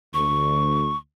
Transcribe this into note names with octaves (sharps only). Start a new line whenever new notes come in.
D2 C#6